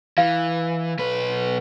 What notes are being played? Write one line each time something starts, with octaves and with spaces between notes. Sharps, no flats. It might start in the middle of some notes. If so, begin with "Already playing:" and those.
E3 F5
B1 B4